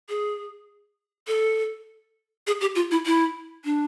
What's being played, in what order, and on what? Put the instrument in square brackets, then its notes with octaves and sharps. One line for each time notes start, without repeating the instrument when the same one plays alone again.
[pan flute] G#4
A4
G#4
G4
F4
E4
E4
D4